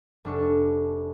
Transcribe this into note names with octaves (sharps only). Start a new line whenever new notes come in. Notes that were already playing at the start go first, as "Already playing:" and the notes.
F1 G3 D4 A4 C#6